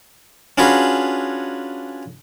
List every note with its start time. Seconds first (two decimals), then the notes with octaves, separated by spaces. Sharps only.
0.58 C#4 D4 F4 F#4 G#4 B4